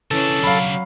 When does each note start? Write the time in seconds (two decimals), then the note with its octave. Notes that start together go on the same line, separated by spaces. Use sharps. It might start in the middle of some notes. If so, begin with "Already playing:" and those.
0.11 C#3 E3 C#4 D4 A4
0.43 F#3 F5 B5